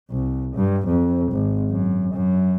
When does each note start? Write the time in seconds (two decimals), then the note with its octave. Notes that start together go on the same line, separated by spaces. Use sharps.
0.10 C2
0.55 G2
0.87 F2
1.32 G#1
1.70 F#2
2.13 F#2